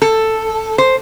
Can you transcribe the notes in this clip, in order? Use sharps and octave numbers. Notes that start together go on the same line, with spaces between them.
A4
C5